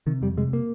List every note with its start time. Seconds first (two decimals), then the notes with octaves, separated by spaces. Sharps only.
0.07 C3 D#3
0.22 F2 G3
0.37 C3 G#3
0.53 A#3